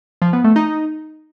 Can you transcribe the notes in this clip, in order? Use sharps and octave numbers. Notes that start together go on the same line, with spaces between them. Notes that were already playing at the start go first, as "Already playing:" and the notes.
F3
B3
A3
D#4